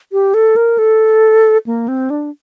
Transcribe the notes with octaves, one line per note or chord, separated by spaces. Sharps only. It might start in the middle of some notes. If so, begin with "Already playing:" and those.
G4
A4
A#4
A4
A#3
C4
D4